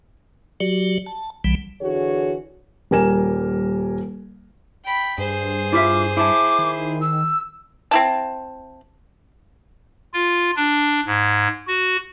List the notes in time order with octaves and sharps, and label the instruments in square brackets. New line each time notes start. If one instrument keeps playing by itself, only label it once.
[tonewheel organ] F#3 F#4 G4 D5
A5
B1 E3 G3
[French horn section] D3 E3 F#4 G#4 C#5
[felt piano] D#1 G3 A#4 G#5 E7
[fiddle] G5 B5
[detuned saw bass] G2 [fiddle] G#4 C5
[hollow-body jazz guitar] E4 F4 E5 [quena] D6
[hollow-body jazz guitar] E4 A5 [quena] D6
[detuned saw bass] D#3
[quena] E6
[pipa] C4 E4 A5
[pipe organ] F4
D4
G#2
F#4